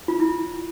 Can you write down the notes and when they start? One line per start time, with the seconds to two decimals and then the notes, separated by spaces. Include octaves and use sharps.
0.08 F4
0.20 E4